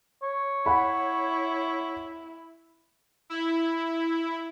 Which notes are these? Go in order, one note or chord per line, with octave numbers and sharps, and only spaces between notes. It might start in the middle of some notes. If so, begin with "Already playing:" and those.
C#5
E4 F#5 B5
E4